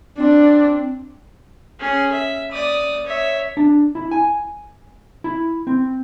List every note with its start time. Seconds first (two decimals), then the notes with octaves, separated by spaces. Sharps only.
0.18 C4 D4
1.80 C#4 G#4
2.11 E5
2.51 D5 D#6
3.05 C#5 E5
3.57 D4
3.95 E4
4.11 G#5
5.24 E4
5.67 C4